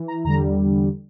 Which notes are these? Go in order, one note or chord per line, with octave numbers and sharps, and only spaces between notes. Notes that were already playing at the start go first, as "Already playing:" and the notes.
Already playing: E3
A#5
E2 D3 G3 A#5